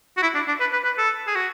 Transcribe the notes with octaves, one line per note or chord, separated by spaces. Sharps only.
F#4
E4
D4
D4
B4
B4
B4
A4
G#4
F#4